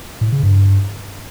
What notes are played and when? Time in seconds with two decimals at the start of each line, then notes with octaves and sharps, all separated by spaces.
0.21 A2
0.32 C#3
0.43 G2